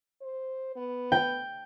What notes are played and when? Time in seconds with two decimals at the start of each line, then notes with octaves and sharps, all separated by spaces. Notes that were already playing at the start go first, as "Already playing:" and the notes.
0.22 C5
0.76 B3
1.12 G5